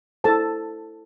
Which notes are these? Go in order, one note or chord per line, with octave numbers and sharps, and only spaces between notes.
E4 A4 C5 A5